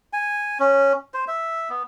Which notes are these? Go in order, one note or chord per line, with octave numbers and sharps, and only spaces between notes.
G#5
C#4
C5
E5
B3